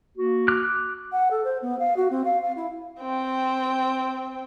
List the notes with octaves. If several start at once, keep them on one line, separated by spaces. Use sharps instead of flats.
A#3 F#4
D6 F6 F#6
F#5
A4
C5
B3
F5
F#4
C4
F5
F5
E4
C4 G5